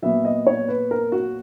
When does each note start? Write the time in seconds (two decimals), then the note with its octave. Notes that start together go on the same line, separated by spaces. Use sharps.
0.02 A#2 F#3 B3 E5
0.25 D#5
0.47 C#5
0.68 B4
0.91 A#4
1.12 F#4